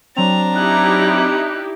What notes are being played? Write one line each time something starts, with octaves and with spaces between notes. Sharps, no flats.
F#3 C4 D4 A#5 F7
D#4 E4 G4 F#6